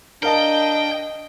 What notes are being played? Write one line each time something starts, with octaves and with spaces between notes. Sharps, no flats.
D4 A#4 D#5 F5 G5 A5